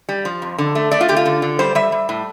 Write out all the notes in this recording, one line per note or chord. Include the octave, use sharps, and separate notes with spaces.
G3
F3
F2
D3
A3
A3 D5
F4
D3 G4
F4
D3
D3
G3 C5
G3 E5
G3
A2